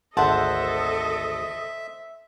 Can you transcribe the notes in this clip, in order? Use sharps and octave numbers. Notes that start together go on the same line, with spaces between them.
G#1 D2 A4 C5 D#5 E5 F#5 A5